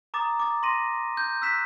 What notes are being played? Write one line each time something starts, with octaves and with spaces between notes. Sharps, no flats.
A#5 D6 D#6 A6
D6 A6
C6 A#6 D#7
G6
E6 F#6 B6 E7